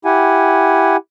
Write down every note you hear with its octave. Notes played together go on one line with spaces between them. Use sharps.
E4 G4 F#5 G#5